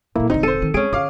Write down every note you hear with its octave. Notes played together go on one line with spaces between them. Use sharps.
A#2 F#3 A#3 E4 A4
E1 D3 C4 D#4
A4 C5 D#7
D#3
G#3 C#4 G#4 D7
D3 F4 F5 D6